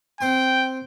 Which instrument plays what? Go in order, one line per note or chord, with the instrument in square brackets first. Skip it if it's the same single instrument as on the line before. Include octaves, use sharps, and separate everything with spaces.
[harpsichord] C4 C6 [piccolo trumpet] G5